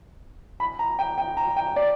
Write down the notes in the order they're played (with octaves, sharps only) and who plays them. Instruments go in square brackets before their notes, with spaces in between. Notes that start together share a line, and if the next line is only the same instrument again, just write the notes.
[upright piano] B5
A#5
G5
G5
A#5
G5
D5